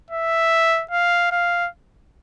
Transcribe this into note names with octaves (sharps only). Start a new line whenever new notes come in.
E5
F5
F5